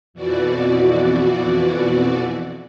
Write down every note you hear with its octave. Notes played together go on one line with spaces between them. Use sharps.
F2 B2 E3 F#4 D5